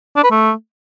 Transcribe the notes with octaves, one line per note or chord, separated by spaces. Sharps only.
D4
B4
A3